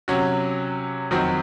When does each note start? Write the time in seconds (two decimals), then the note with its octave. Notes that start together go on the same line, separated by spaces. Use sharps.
0.08 C3 F#3 C#4 F#4
1.11 F2 D#3 F#3 C4 F#4